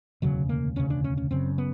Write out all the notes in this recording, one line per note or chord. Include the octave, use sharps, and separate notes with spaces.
E1 D2 C#3 F#3
A#3
E1 D2 C#3 C#4
D4
C#4
C#4
F#1 F#2 C#3 C4
B3